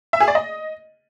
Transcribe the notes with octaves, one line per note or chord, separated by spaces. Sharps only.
E5
G#4
D5
D#5